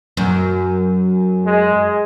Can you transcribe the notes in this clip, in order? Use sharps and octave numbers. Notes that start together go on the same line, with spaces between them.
F#2
G#3